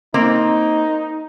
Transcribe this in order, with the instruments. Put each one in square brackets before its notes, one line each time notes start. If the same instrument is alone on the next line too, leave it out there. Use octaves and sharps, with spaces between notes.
[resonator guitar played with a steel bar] A#3 C4 [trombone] D#4